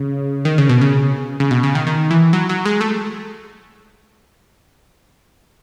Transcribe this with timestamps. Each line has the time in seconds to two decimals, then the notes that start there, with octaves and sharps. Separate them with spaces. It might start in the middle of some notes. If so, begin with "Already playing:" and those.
Already playing: C#3
0.45 D#3
0.58 C#3
0.69 B2
0.81 C#3
1.40 C#3
1.51 B2
1.63 C#3
1.75 D#3
1.87 D#3
2.11 E3
2.33 F#3
2.49 F#3
2.66 G#3
2.81 A3